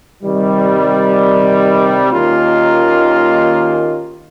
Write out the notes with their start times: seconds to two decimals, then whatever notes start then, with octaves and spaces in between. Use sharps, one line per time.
0.23 C3 D#3 G3
2.12 D#2 D#3 A#3 C#4 F4